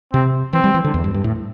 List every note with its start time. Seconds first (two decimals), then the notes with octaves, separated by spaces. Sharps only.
0.13 C3 C4
0.53 E3 C4
0.64 G3
0.74 E3
0.84 D3
0.94 E2
1.04 G2
1.14 G2
1.24 A2